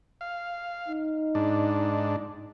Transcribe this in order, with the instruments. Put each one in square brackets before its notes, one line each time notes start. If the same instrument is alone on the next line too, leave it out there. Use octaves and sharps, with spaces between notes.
[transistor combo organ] F5
[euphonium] D#4
[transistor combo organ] G#2 D4